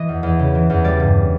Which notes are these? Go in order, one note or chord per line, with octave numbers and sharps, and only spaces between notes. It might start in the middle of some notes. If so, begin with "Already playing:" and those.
Already playing: E3 D#5
E2
E2
C#3
E3
E2
G3 D5
G2